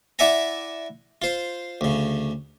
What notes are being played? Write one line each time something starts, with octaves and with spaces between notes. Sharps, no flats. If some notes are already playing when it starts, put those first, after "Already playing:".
E4 D5 E5 F#5 G#5 A#5
F4 C5
D2 C#3